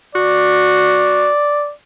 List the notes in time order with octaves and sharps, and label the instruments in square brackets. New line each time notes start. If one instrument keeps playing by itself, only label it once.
[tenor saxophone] F#4 [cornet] D5